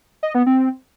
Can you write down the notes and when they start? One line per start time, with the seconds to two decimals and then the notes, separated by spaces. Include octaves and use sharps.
0.23 D#5
0.35 B3
0.47 C4